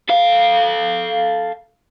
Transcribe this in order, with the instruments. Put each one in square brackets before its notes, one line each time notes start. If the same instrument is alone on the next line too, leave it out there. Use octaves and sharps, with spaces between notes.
[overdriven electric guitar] A4 F5